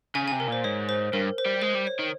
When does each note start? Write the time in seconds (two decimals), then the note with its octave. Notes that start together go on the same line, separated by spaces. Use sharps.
0.15 C#3 G#5
0.28 G#5
0.32 C3
0.40 A#4
0.48 A#2 C5
0.64 G#2 C#5
0.89 C5
1.13 G2 A#4
1.38 C5
1.46 G3
1.62 G#3 C5
1.75 G3
1.87 C#5
1.99 D#3